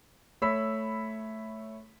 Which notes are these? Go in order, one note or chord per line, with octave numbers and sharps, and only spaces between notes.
A3 C#5 B5 E6 B6